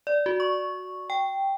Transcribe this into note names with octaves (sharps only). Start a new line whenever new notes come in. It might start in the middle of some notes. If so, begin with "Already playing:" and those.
D5
F#4
C#6
G5